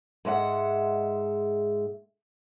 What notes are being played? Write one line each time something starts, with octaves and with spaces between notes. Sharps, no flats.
G#2 G#3 E5 F#5